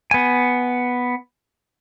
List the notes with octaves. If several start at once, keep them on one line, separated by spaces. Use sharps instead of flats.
B3 G#5